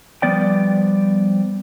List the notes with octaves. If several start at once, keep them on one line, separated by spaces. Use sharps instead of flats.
F3 G3 B3 D5 G5